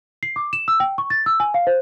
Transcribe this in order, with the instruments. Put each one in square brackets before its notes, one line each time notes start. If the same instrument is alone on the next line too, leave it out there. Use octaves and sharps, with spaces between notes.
[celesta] C7
D6
E7
E6
G5
C#6
A6
E6
G#5
F5
C5